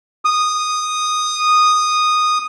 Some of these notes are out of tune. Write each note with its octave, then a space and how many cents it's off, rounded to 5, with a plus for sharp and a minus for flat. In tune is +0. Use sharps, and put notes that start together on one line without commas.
D#6 -10